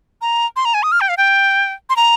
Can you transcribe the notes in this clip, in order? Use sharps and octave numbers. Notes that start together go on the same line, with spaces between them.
A#5
C6
A#5
G#5
D#6
F6
G5
F5
G5
C6
A#5